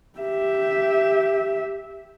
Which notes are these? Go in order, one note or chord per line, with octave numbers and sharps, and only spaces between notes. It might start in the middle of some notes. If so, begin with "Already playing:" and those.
G4 E5